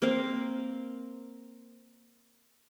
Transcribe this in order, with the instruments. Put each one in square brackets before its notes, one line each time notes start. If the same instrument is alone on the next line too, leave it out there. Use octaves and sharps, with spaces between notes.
[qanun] A#3 C4 A#4 F5